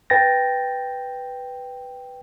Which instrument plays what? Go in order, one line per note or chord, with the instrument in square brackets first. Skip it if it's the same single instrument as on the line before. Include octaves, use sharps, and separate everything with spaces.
[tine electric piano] B4 G5 A6 A#6